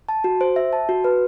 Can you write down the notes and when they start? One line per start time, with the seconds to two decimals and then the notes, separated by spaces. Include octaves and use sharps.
0.09 A5
0.24 F#4
0.41 C5
0.56 E5
0.73 A5
0.89 F#4
1.04 B4